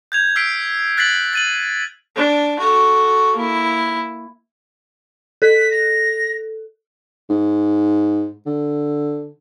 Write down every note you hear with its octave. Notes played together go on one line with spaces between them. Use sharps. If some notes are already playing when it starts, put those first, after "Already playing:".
G6 G#6 F7
E6 F6 B6 C7 D7
F#6 A6 B6 C7 F#7
A6 D#7 F#7
D4
F#4 A4
A#3 E4
A4 B6
A#6
G#2
D3